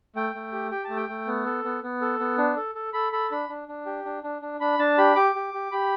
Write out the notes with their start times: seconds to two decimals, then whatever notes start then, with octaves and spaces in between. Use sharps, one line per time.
0.16 A3 G5
0.35 A3
0.52 G4
0.71 G4 G5
0.84 A3 A5
0.97 G5
1.09 A3
1.27 B3
1.45 A4
1.64 B3
1.83 B3
2.01 A4
2.19 B3
2.38 D4
2.56 A4
2.75 A4
2.93 A4 B5
3.12 A4 B5
3.31 D4 B5
3.49 D4
3.68 D4
3.86 G4
4.05 D4
4.23 D4
4.42 D4
4.60 D4 B5
4.79 D4 A5
4.98 G4 B5
5.16 G4 D6
5.35 G4
5.54 G4
5.72 G4 B5